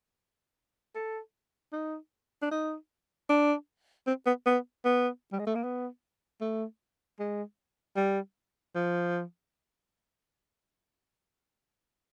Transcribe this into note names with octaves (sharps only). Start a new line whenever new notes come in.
A4
D#4
D4
D#4
D4
C4
B3
B3
B3
G3
G#3
A3
A#3
B3
A3
G#3
G3
F3